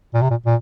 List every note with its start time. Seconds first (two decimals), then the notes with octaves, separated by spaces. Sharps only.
0.14 A#2
0.22 C3
0.30 A#2
0.46 A#2